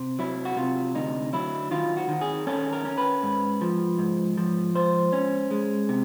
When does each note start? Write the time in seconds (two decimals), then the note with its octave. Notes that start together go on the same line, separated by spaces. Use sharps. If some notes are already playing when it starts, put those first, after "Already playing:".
Already playing: C3
0.19 F#3 E4
0.45 F#4
0.57 C3 F4
0.95 D2 D#4
1.33 F#3 E4
1.71 D#3 F4
1.97 F#4
2.09 D#3
2.21 G#4
2.47 C#4 A4
2.73 A#4
2.85 C#4
2.98 B4
3.23 G#2
3.61 F3
3.98 G#2
4.37 F3
4.75 G#2 C5
5.13 C#4
5.51 G#3
5.89 C3